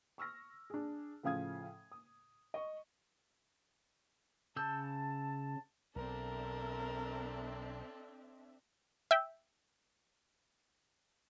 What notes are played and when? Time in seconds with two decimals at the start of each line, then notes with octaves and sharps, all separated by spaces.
0.18 C#6 E6 F6 A#6
0.70 D4 G#4
1.23 A2 C#3 F3 F5 D#6 G#6
1.92 D#6
2.54 D#5 C#6
4.56 C#3 A5 E6 G6
5.96 B1 C4 D4 A4 A#4 E5
9.11 E5 G5